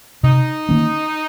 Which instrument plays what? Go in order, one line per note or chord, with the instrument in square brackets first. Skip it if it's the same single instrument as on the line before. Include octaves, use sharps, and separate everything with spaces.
[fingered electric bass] C3 [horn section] D#4
[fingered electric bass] D#3 A#3 C#4